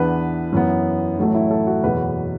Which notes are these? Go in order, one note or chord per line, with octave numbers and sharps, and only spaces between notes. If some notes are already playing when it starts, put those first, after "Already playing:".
Already playing: E2 E3 B3 D4 B4
F#2 E3 B3
A1 A2 F#3 A3
E4
A4
F#4
F#1 E2 B2 F#3 B4